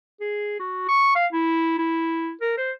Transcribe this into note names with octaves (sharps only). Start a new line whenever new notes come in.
G#4
F#4
C#6
F5
E4
E4
A#4
C5